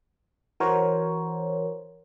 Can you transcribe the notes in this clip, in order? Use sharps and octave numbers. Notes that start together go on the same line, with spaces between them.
E3 F#4 A#4 C5 C#5